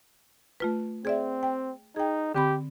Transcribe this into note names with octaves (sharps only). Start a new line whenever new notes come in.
A3 F4 B4
C4 G#4 D5 E5
G5
D#4 G#4 G5
D3 C4 G4 B5